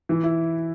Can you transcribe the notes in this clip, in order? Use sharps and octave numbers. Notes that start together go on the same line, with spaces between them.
E3
E4